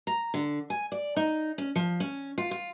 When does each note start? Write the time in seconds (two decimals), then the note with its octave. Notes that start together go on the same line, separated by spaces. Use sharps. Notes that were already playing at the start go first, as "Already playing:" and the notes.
0.07 A#5
0.34 D3
0.70 G#5
0.92 D5
1.17 D#4
1.58 C#4
1.76 F3
2.00 C#4
2.38 F4
2.51 F4